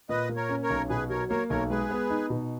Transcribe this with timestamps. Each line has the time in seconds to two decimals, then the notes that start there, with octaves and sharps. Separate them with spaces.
0.09 A#2 B4 D#5
0.29 A#3
0.36 A#4 C#5
0.49 C#4
0.63 A#4 C#5
0.70 B1
0.90 B2 G#4 B4
1.09 F#3 A#4 C#5
1.30 A#3 A#4 C#5
1.50 B1 A#4 C#5
1.70 G#3 G#4 B4
1.91 B3
2.10 D#4
2.30 B2